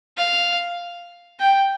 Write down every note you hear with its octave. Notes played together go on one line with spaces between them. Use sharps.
F5
G5